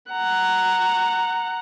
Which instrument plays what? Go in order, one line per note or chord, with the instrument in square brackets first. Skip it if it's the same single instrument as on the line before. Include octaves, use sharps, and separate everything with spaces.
[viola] F#5 A#5